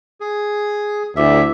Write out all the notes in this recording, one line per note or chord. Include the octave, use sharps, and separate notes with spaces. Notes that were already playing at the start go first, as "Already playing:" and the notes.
G#4
D2 E4 E5 D6 E6